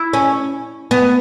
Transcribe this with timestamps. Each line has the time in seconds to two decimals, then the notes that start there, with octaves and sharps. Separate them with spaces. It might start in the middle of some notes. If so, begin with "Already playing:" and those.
Already playing: E4
0.13 C#4
0.91 B3